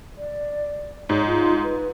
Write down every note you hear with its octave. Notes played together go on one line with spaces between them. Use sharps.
D5
G#2 C#5
F4
B4